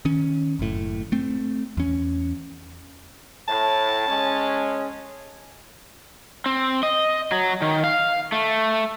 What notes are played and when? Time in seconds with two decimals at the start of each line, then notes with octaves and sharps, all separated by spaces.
0.05 D#3 C#4
0.59 F#1 A2
1.12 A3 C4
1.77 E2 C#4
3.48 A2 A5
4.07 G#3 C#4
6.46 C4
6.83 D#5
7.32 F#3
7.62 D#3
7.84 F5
8.32 A3